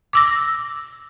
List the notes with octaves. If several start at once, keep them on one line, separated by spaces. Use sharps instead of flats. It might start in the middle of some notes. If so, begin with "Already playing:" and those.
D6 E6 A#6